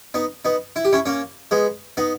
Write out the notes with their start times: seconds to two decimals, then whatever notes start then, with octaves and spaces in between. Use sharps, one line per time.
0.14 B3 D#4
0.45 B3 D#4
0.76 E4
0.85 G4
0.93 C#4 E4
1.06 A#3 C#4
1.51 G#3 B3
1.97 B3 D#4